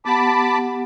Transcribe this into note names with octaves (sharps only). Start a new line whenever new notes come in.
B3 G4 F#5 A5 B5 D6